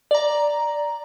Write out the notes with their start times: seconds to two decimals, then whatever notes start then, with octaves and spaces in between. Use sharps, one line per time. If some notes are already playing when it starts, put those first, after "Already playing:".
0.11 D5 A#5